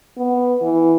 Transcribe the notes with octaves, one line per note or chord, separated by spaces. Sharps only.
B3
E3